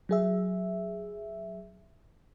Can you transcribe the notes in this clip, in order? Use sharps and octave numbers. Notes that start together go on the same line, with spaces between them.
F#3 G#4 E5